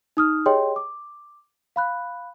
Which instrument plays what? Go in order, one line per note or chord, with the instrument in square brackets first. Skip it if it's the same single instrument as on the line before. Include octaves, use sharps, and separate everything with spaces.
[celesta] D#4 D#6 F6
G4 G#4 C#5 D#5 G5 C6
D6
F5 B5 F#6